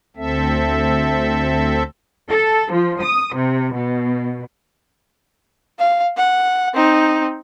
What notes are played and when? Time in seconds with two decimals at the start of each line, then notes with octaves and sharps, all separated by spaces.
0.16 D2 C4 A4 E5
2.28 A4
2.72 F3
3.03 D#6
3.35 C3
3.74 B2
5.79 F5
6.17 F#5
6.74 C4 D#4